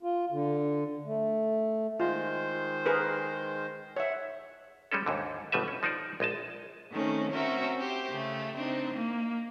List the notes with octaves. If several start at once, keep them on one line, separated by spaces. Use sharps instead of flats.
F4
D3
A3
D#3 G#3 F4 C5
G#4 A#4 B4
C#5 E5 F#5
G3 G#3 C#4 A4
D#2 G#2 D3
G1 B2 G3 B4 E5
C#4
F3 D#4 C5 D5
A#1 G#3 D#5 A5
D#3 A3 C4 C#4
C4 C#4 F#4 A#4 E5
G4 C5
C#3 A3
C4 D4 D#4
A#3